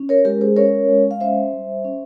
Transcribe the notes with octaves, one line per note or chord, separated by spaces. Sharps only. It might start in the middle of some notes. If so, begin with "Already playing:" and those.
Already playing: C#4
A#4 C#5
G#3 G4 A#4
G#4 C5
C#4 A#4 C#5
G#3
F5
C#4 C5 E5
G3
C#4